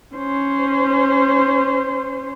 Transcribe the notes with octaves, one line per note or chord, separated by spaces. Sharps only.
C#4 C5